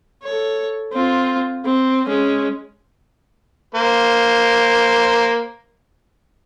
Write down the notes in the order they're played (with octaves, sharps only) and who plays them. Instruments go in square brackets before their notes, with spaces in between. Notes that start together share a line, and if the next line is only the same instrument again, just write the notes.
[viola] A4 C#5
C4 F4
C4
G#3 C#4
[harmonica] A#3 C5